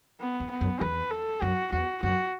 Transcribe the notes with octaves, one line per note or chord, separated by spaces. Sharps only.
B3
E2
B3
F#2
E2 B4
A4
F#2 F#4
E2 F#4
F#2 F#4